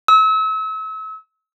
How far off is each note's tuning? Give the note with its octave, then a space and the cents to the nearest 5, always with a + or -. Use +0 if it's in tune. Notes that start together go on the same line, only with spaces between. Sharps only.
E6 -35